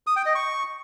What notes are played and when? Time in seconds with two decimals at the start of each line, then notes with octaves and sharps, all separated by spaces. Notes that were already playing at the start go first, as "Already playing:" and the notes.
0.07 D#6
0.16 G5
0.26 D#5
0.35 C#6